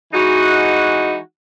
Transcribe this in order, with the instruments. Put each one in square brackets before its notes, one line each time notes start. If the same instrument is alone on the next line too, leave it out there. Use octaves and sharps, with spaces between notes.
[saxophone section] E3 G#3 D#4 F#4